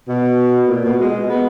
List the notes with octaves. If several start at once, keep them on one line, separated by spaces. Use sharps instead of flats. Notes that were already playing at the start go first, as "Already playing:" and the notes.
B2
A#2
B2
G#3
B3